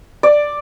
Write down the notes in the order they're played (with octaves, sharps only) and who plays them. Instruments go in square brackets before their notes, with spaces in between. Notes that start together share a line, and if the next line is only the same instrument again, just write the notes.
[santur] D5